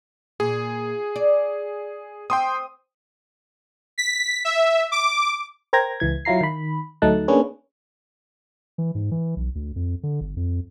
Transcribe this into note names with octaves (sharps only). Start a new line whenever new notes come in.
A#2 G#4
D5
C4 G5 C6 D#6
B6
E5
D6
A#4 C5 G5 A#5 G#6 A#6
C#2 E3 G#6
F#3 E4 F4 A#5 C7
D#3 B5
D2 F#3 A3 D#4 A5 F#6
A#3 C#4 D4 G#4 B4 C#5
E3
G#2
E3
B1
D2
F2
D3
G1
F2